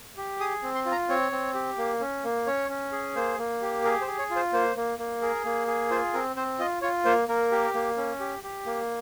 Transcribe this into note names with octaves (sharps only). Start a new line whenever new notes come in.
G4
G#4 D#6
C4
C6
F4
A#5
C4 C#5
C4
G4
A#3
C#4
A#3
C#4 C#5
C#4
G#4
A#3 C5
A#3
G4
G#4 A#4
C5
G#4
C#5
F4
C5
A#3 C5
A#3
A#3
G#4 A#4
A#3
G#4
F4 C5
C4 A#4
C4 C5
F4 D#5
F4 C#5
A#3 C5
A#3 A#4
G4
A#3
C#4
G4
G4
A#3